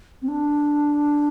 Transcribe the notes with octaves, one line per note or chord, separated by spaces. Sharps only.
C4
D4